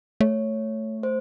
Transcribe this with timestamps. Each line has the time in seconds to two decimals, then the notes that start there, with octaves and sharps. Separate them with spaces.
0.20 A3 C#5
1.03 C5